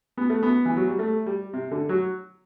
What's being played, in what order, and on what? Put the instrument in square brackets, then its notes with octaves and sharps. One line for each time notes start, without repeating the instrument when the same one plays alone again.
[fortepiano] B3
A3
B3
E3
F#3
G3
A3
G3
C3
D3
F#3